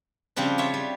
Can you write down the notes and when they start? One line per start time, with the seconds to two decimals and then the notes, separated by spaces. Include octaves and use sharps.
0.36 C#3 F3 G3 C4 D4
0.58 F4 C#5 E5
0.74 G3